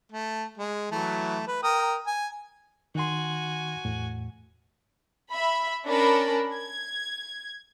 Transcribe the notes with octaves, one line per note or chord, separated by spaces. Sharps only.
A3
G#3
E3 F#3 A3
B4
A#4 G5 D#6
G#5
D#3 F#4 G#5 C6
E2 A2
E5 B5
C#4 D4 A#4 A5 B5
G#6